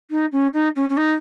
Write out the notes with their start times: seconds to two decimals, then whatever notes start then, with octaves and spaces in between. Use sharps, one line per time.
0.10 D#4
0.32 C#4
0.53 D#4
0.76 C#4
0.89 C#4
0.97 D#4